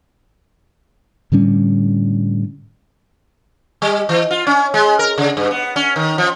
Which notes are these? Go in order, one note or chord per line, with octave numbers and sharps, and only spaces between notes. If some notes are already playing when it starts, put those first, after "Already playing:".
A2 D3 G3 C#4
G3
E3
F4
C#4
G#3
A#4
C#3
G2
B3
C#4
D#3
F3